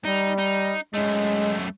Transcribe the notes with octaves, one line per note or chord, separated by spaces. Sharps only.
G3 D#4
D#4
F#2 G#3 A3